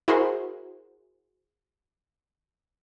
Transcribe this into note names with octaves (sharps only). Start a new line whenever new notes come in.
E4 F#4 G#4 A#4 C5